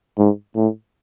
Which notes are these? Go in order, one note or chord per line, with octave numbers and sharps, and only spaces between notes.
G#2
A2